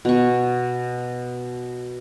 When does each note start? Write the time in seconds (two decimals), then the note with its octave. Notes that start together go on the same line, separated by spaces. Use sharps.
0.05 B2 C#6